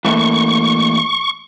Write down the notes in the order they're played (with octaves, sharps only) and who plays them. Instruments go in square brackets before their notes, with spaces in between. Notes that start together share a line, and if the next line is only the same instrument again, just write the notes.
[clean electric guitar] E3 A3 A#3 [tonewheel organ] C#6